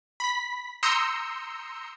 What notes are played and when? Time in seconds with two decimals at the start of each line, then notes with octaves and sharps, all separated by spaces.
0.20 B5 B6
0.83 A#5 C6 D#6 E6 G6 C#7